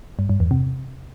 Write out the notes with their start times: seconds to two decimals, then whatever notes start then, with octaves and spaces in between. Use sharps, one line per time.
0.19 G2
0.29 G2
0.40 E2
0.51 C3